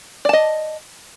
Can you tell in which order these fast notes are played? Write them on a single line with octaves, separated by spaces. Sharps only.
D5 A5 D#5